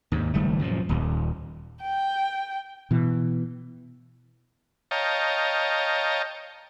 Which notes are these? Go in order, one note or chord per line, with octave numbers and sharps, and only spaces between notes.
D#2 G#2
F#1 D#3 G3 A3
F#2 A#2 D#3 F3
D#1 D#2
G5
B2 E3
C#5 D#5 F5 G5 A5 A#5